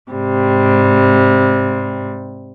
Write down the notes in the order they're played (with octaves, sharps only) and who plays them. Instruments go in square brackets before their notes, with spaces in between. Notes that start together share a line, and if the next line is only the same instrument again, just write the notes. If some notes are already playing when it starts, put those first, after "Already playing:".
[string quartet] G#2 C3 G3